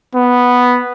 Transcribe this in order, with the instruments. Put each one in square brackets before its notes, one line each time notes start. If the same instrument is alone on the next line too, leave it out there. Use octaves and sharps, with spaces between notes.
[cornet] B3